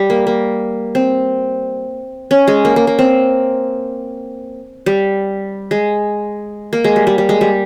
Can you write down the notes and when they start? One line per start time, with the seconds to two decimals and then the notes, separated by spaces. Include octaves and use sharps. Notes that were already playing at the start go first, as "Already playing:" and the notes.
Already playing: G3
0.10 A#3
0.27 A#3
0.95 C4
2.31 C#4
2.47 G#3
2.65 A#3
2.76 A#3
2.87 A#3
2.99 C4
4.86 G3
5.71 G#3
6.73 A#3
6.84 G#3
6.96 G3
7.07 G3
7.18 G3
7.29 G#3
7.41 G3